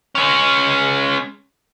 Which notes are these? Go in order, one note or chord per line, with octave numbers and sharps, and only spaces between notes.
G#3 C#4